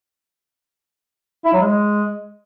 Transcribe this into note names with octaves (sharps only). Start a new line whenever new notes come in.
E4
F#3
G#3